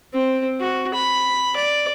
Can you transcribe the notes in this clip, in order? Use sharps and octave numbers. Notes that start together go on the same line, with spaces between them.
C4
F#4
B5
D5